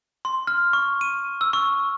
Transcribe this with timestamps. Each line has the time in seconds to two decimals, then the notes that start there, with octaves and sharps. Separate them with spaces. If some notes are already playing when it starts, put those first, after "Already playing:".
0.25 C6
0.47 F6
0.73 C#6
1.01 D#7
1.41 E6
1.53 C#6